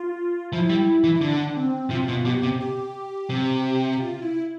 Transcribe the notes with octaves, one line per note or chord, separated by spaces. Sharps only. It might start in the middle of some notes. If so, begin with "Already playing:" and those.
Already playing: F4
F3 E4
G3
E3
E4
D3 D4
C4
C3 F4
B2
B2 G4
C3
G4
C3
G4
F4
E4